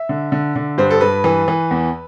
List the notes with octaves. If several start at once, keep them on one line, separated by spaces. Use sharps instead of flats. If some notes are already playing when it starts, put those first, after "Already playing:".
Already playing: E5
D3
D3
D3
G2 C5
A4
G2 B4
E3
E3
E2